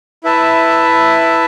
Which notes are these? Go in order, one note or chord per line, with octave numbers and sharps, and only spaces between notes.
E4 B4 E5 A5